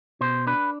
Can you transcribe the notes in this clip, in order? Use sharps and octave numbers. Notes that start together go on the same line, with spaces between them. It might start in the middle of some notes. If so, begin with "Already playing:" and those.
B2 C5
D4 B4